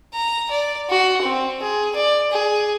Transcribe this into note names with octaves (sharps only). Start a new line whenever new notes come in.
A#5
D5
F#4
C4
G#4
D5
G#4